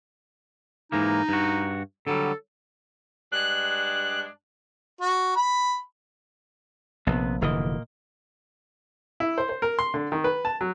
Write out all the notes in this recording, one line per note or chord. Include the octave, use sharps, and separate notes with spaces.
G#2 E3 A#3 D#4
G2 F#4
D3 F#3 G3 A4
G2 G#3 D4 F#6
F#4
B5
A#1 C3 B3
F1 A#2 D3 E3 A#3 D#5
E4
C5
C5
A#4
C6
D3
D#3
B4
A5
F#3